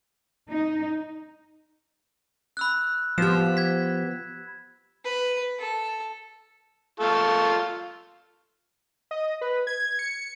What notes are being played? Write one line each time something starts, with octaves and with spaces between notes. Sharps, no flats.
D#4
B5 E6 F#6
F3 B3 G4 E7
G#6 B6
B4
A4
F4 A4 C#6
D#5
B4
G#6
C#7